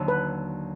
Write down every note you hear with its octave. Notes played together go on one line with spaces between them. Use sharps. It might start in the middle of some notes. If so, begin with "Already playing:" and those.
Already playing: D#2 D3 F#3
B4